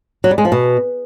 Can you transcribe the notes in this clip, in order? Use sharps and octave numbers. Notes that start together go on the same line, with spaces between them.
F#3
G3
G#3
F3
B2